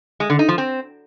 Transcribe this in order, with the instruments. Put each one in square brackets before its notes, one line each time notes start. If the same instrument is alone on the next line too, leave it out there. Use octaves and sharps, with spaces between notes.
[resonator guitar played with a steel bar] G#3
D3
D#4
F3
C4